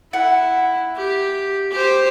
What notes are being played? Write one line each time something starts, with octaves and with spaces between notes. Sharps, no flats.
E4 F#5
G4
G4 C5